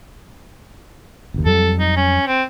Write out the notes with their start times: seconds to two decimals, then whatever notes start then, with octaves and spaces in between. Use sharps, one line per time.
1.34 F#1 D#2
1.46 F2 F#3 G3 A4
1.79 D#4
1.97 C#4
2.27 C4